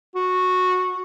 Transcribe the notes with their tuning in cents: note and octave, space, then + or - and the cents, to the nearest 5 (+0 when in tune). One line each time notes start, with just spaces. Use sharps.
F#4 -10